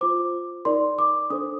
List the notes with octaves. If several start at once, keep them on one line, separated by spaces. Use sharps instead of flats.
F4 C5 D6
D#4 A#4 D5 C6
D6
D4 A4 C5 D#6